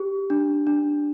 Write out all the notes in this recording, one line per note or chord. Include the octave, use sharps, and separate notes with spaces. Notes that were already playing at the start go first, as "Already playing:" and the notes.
Already playing: G4
D4
D4